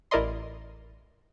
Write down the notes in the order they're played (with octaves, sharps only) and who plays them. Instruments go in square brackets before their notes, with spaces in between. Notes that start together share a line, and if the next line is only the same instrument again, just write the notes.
[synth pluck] A1 E4 A#4 D5 D#5 C6